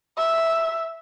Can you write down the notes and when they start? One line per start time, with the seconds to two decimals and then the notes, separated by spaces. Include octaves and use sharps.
0.18 E5